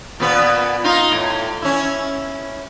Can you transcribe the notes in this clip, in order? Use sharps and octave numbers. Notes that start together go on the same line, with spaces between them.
A#2 B3 B4
D#4 F4
A2
C#4 E4